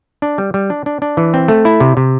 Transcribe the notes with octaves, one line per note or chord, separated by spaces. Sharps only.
D4
G3
G3
D4
D4
D4
E3
C4
A3
E4
C3
C3